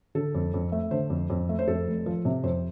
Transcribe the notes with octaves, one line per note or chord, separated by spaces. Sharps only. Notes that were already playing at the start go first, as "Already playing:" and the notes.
D3 A4
F2
F2
A3
D3 C5
F2
F2
A3
C5
F2 A4
F1
F3
C3
F2 C5